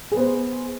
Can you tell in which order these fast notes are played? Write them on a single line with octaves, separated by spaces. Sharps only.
G#4 B3 C5